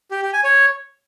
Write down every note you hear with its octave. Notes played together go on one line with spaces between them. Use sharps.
G4
G4
G#5
C#5